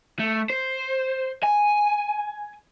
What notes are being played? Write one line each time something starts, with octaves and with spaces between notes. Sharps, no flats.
A3
C5
G#5